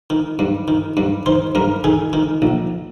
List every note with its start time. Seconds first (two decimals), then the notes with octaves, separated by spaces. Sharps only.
0.10 D#3
0.39 G2
0.68 D#3
0.97 G2
1.26 D#3 C5
1.55 G2 A#4
1.84 D#3 G#4
2.13 D#3
2.42 A#1